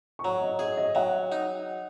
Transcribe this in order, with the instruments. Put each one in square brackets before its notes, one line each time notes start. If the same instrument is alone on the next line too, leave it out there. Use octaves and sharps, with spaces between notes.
[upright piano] C#6
[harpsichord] F#3 [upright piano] A#5
[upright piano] D#5
[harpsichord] G#4 [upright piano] D#5
[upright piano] D#5
[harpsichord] F#3 [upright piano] F#5
[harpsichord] D#4